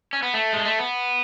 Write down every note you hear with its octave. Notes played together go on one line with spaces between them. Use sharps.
C#4
B3
A3
G#3
A3
B3